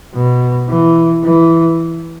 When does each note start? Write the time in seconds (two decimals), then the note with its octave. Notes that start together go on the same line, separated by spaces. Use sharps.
0.15 B2
0.69 E3
1.24 E3